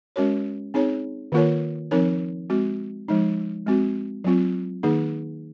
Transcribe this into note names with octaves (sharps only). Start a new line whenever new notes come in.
G#3 C#4 F#4 A#4 C#5
C4 D#4 G#4 C#5
D#3 A#3 F4 A#4 C#5
F3 C4 D#4 A#4 C#5
G#3 C4 F#4
F3 G#3 D#4
G#3 C4 F#4
F#3 C4 F4
D#3 A#3 D#4 G#4